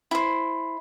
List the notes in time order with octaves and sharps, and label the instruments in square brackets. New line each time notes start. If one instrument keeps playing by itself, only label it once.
[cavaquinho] E4 C5